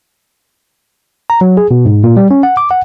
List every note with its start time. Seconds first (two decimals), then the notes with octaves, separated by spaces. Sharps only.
1.30 A#5
1.41 F#3
1.57 G#4
1.71 B2
1.85 G#2
2.04 A#2
2.17 G3
2.31 C#4
2.43 F#5
2.57 D6
2.71 F#5